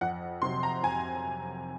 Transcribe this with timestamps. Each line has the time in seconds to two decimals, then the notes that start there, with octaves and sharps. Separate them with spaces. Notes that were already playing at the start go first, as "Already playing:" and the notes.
0.01 F2 F#5
0.42 C3 F#3 C6
0.63 A#5
0.83 F2 G#5